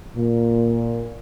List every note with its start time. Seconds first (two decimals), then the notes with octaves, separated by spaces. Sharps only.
0.17 A#2